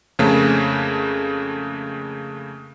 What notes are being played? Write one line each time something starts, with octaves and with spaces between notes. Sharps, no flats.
F2 C#3 A3 A#3